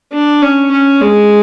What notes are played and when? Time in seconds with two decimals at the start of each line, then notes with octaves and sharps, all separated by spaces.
0.13 D4
0.42 C#4
0.71 C#4
1.01 G#3